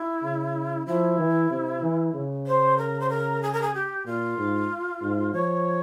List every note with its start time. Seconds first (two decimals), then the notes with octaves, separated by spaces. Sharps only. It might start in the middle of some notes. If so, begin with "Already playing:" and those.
Already playing: E4
0.23 C#3
0.87 F3 E4
1.19 E3
1.51 C3
1.82 E3
2.14 C#3
2.47 C5
2.78 A#4
3.00 C5
3.09 A#4
3.42 G#4
3.53 A#4
3.62 G#4
3.74 G4
4.06 A#2 F4
4.38 G#2
5.01 G#2
5.33 F3 C#5